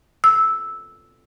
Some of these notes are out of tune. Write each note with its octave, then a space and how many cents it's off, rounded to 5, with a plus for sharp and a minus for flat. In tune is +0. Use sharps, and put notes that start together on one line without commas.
E6 -5